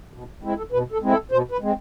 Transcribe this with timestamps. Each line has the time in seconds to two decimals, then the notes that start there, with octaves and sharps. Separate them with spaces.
0.13 B2
0.43 G#3 C4 E4
0.58 A4
0.72 B2 B4
0.92 A4
1.02 G#3 C4 E4
1.12 A4
1.32 B2 C5
1.51 B4
1.61 G#3 C4